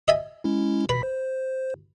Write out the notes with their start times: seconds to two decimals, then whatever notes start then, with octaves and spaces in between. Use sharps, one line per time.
0.08 D#5 E5 G#5
0.44 G#3 C#4 E4
0.89 B2 B4 B5 B6
1.03 C5